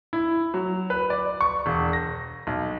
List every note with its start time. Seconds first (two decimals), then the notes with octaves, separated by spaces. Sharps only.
0.13 E4
0.54 F#3
0.90 B4
1.10 D5
1.41 C#6
1.66 E1
1.93 A#6
2.47 B1